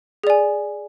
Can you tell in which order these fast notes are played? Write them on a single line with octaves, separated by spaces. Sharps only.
G#4 D5 G#5